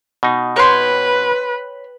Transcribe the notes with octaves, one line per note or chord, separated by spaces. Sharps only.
B2 D#4
B4 C#5 G5 C6